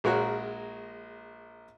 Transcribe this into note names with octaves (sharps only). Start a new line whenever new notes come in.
A#1 G#3 F#4 A#4 C#5 F#6